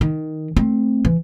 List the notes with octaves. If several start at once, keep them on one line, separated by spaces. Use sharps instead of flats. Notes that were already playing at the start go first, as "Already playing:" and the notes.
D#3
A3 C4
E3